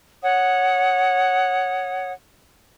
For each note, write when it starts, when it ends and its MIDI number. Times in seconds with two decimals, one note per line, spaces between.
0.23 2.12 73
0.23 2.12 78
0.23 2.12 87